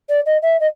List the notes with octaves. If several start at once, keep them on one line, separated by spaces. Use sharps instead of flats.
D5
D#5
E5
D#5